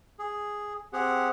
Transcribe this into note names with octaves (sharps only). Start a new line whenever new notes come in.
G#4
C4 G4 G#4 F#5